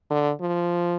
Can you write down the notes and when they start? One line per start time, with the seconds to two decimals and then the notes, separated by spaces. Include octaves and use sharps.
0.10 D3
0.41 F3